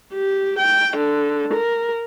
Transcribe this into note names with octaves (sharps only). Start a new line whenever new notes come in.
G4
G5
D3
A#4